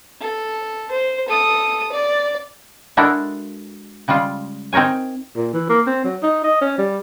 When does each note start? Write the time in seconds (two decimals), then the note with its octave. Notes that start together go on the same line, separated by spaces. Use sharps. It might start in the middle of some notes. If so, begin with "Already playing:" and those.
0.21 A4
0.91 C5
1.28 A4 D#6
1.92 D5
2.97 G#3 D4 E4 F#4 A4 A#4
4.08 C#3 G3 G#3 F4
4.73 C4 D#4 A#4 C#5 G#5
5.37 A#2
5.53 E3
5.70 A#3
5.87 C4
6.04 F#3
6.23 D#4
6.44 D#5
6.61 C#4
6.78 G3